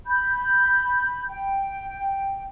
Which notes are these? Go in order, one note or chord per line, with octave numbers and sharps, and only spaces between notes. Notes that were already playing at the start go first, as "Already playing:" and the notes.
B5 G6
G5